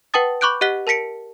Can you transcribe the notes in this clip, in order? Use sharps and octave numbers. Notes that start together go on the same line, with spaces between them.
B4 F#5 G5 A5 D#6 A6
B5 C#6 D6 F#6 G6 D7
G4 D#5 F#5 F#6 B6 G7
A#4 A5 A#6 B6 C#7 D7